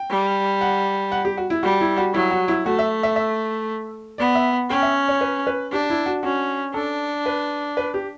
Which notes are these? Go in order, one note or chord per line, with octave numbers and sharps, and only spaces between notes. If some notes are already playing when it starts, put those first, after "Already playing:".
Already playing: G5
G3
F#5
F#5
G4
F#4
E4
G3 F#4
E4
F#4
F#3 E4
F#4
E4
A3 F#4
E5
E5
E5
B3 D5
E5
C#4 G5
E5
C#5
B4
B4
D4 G4
E4
F#4
C#4 F#4
D4 A4
B4
B4
G4